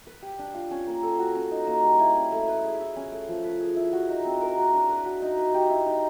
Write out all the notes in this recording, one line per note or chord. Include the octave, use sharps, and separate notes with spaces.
B4
G4
D4
F4
C#4
A#3
A4
F#4
C#4
D#4
A#3
G3
E4
C#4
A3
B4
G#4
E4
C#4
A3
F3
B4
G#4
E4
F#4
D#4
C4
A#4
F#4
D4
B4
F#4
D#4
B4
G4
E4
D#4